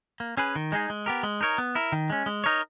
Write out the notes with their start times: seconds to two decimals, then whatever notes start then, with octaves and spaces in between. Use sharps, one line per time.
0.20 A#3
0.37 C#4 G#4 B4
0.56 D#3
0.72 G#3 D#4 G#4
0.90 G#3
1.06 B3 G4 A#4
1.23 G#3
1.41 D#4 A#4 C#5
1.58 B3
1.75 E4 A#4
1.92 D#3
2.10 G#3 C#4
2.26 G#3
2.44 D#4 A#4 C#5